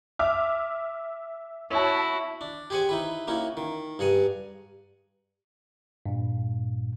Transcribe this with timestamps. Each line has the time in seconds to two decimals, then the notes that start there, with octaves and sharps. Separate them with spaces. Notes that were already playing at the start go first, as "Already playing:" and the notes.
0.19 E5 D6 F6
1.71 E4 F#4 C#5 A5
2.41 D4
2.70 G4 G#4 C5 F#5 G#5
2.89 D#4 E4 B4
3.27 A#3 C#4 D#4 E4 F#4
3.57 D#3
3.99 G2 G#4 F#5 A#5 D#6
6.06 G2 A#2